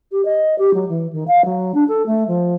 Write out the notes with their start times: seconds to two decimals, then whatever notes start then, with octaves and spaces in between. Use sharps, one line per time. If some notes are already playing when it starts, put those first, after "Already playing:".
0.11 G4
0.25 D#5
0.58 G4
0.73 F#3
0.88 E3
1.12 D#3
1.27 F5
1.44 F#3
1.74 D4
1.88 A4
2.06 A3
2.27 F3